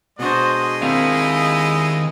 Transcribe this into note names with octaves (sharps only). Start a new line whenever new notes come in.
B2 G#3 D4 F#4 C5 D#5
D#3 C4 E4 A#4 F5 F6